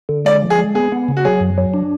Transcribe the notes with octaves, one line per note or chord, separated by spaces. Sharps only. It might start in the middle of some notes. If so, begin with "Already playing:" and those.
D3
G#3 D5
F3
G#4
G#3
B3 G#4
B3
C#3
F#4
F#3 G#4
F#2
F#3
D4